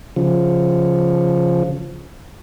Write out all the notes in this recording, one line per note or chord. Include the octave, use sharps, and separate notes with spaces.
C#3 F3